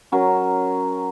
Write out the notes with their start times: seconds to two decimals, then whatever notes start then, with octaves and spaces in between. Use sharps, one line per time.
0.12 F#3 C#4 A#4